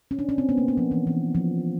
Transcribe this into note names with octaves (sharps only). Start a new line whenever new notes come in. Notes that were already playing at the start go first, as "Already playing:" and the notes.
C#4
D4
C#4
C4
B3
A#3
B3
F3
E3
E3
F3